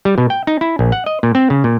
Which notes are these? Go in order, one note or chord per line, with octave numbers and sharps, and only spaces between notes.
G3
B2
G5
D#4
E4
A#1
F#5
D#5
A#2
C4
C#3
A#2